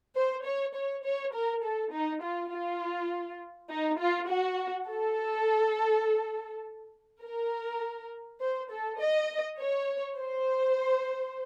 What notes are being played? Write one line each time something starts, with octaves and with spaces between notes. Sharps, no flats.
C5
C#5
C#5
C#5
A#4
A4
D#4
F4
F4
D#4
F4
F#4
A4
A#4
C5
A4
D#5
C#5
C5